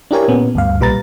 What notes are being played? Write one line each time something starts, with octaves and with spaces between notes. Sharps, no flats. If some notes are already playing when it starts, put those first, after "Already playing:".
D4 E4 G4 A#4 C#5 G#5
A#2 B3 C#4
D2 G2 F5
B1 A#2 G3 B4 A#5 A6